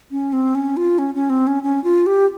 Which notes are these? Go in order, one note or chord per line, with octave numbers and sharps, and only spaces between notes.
C#4
C4
C#4
F4
C#4
C#4
C4
C#4
C#4
F4
G4